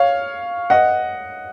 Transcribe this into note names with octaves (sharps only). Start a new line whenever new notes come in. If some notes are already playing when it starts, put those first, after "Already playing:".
Already playing: C#5 F5
D#5 F#5